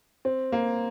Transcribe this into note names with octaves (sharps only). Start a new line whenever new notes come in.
C4
A#3